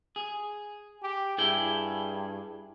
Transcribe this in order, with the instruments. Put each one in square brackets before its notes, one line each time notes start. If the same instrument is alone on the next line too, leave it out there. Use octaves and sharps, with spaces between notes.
[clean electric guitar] G#4
[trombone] G4
[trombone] G2 [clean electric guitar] E4 G#4 G5